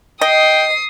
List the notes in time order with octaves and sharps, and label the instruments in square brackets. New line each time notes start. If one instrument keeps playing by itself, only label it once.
[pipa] D#5 [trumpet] G5 [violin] D#6 C7